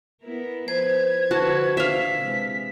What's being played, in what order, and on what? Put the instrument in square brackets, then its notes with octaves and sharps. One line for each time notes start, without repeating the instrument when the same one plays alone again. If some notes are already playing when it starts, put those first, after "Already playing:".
[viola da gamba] B3 E4 A#4
[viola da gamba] F3 B4 [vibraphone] C5 [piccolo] G#6
[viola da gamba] D3 F3 B4 [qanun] F#4 A5
[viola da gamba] D4 [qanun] E5 F5 [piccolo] B6
[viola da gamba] C3 E3 G#3